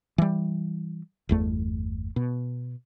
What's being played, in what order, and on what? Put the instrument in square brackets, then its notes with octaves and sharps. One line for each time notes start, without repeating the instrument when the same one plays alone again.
[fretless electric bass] E3 G3
G1 E2 A3
B2